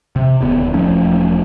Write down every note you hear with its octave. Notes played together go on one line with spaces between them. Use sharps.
C3
D1 D#2 B3
E1 F3 A3 C#4